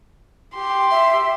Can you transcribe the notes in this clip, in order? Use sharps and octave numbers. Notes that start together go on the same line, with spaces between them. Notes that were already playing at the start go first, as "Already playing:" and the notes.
G4 C6
E5